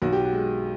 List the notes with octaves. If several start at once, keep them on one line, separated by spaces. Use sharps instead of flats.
B1 F#4
G4
F#4
G#3